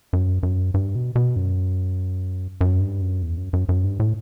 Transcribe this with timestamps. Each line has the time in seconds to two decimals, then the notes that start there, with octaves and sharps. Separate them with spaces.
0.13 F#2
0.43 F#2
0.74 G2
0.95 B2
1.16 B2
1.36 F#2
2.61 F#2
2.80 G2
3.01 F#2
3.23 E2
3.37 F#2
3.53 F#2
3.69 F#2
3.84 G2
4.00 A2